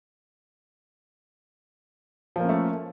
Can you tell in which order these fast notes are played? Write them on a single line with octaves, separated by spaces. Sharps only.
F3 A#3 C#4 A3